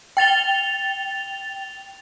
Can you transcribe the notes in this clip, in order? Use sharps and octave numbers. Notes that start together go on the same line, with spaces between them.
G5 A6 F7 G7